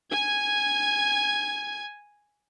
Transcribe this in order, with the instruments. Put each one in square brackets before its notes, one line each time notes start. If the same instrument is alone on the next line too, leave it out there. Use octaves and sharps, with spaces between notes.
[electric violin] G#5 G#6